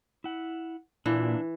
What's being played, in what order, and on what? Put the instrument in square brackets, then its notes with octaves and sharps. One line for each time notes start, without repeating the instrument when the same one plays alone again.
[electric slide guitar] E4 F#5
[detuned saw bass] A#2 [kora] E3 [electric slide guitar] D4 E4